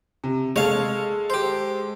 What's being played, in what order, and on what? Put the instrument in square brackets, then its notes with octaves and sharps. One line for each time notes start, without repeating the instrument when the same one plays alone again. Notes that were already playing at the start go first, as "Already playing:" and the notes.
[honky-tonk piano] C3
[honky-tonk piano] G#3 A4 [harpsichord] C#5 F5
[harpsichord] G4 C5